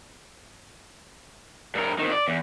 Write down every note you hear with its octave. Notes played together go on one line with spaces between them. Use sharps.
G2 A#4
F2 D#3
D5
E2